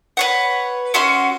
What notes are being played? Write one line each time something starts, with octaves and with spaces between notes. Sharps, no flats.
B4 C#5 F#5
C#4 F#4 E5 C6